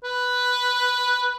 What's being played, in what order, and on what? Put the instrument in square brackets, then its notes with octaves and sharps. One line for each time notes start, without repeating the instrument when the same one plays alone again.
[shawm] B4